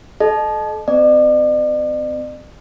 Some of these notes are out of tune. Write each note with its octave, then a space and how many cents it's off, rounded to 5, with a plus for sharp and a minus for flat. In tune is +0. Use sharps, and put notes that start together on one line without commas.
A4 -30 D#5 -30
C4 -30 D5 +45